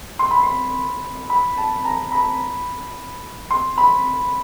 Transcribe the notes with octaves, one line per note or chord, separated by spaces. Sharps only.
C6
B5
C6
B5
A5
A#5
B5
C6
B5